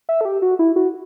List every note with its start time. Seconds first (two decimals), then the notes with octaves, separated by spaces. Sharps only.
0.09 E5
0.21 A4
0.25 G4
0.42 F#4
0.59 E4
0.76 F#4